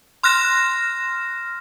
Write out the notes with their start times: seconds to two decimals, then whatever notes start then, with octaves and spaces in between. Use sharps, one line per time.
0.23 C6 F6 F#6 A#6 E7